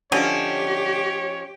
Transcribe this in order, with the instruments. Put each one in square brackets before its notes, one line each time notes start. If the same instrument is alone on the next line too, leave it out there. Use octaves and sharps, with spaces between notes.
[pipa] D3 [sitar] F3 C#4 D#5 [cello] G4 [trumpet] C#5